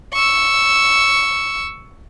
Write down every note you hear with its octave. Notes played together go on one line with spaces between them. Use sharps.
C#6 E6